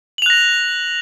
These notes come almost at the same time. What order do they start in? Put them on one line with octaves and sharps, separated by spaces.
F#7 F7 F#6 A#6